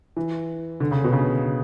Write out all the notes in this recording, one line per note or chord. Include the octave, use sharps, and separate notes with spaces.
E3
D3
C#3
B2
C#3